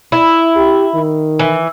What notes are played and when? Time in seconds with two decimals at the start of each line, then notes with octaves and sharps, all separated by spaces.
0.12 E4
0.57 G4
0.95 D#3
1.39 E3